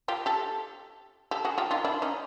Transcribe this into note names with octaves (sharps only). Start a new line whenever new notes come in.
F4 G4
G4 A4
G4 A4
F#4 G#4
F4 G4
D#4 F4
D4 E4
C#4 D#4